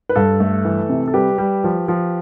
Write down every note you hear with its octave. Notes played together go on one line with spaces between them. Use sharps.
B4
G2 A4
A3
E3
C3
A4
G3 G4 B4
G3
F3
F3